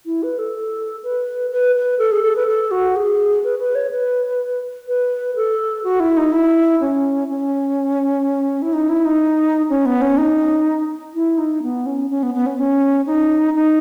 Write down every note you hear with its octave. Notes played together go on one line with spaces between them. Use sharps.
E4
B4
A4
B4
B4
B4
A4
G#4
A4
B4
A4
F#4
G#4
B4
B4
C#5
B4
B4
A4
F#4
E4
D#4
E4
C#4
C#4
E4
D#4
E4
D#4
C#4
B3
C#4
D#4
E4
D#4
B3
C#4
C#4
B3
B3
C#4
C#4
D#4
D#4